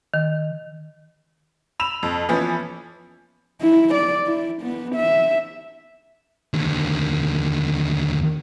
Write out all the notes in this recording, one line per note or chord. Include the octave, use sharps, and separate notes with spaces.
D#3
B5 E6 E7 F7
F2
E3 F3 B3 C#4
E4
D5
E4
B3
E5
D#2 D3